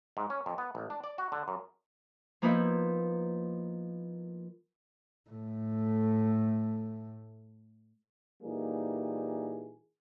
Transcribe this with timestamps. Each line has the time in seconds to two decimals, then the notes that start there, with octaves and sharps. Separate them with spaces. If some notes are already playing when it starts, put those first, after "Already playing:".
0.17 G#2
0.30 C#4
0.46 F2
0.58 B3
0.75 A1
0.90 D4
1.04 D5
1.18 F#4
1.32 D3
1.48 F#2
2.42 F3 A#3 B3 D#4 E4
5.30 A2 A3
8.43 A#2 E3 G3 A#3 D#4 G#4